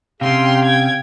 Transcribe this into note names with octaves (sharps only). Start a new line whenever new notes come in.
C3 C#4 G4 G#4 F5 G5 C6
G5 G#6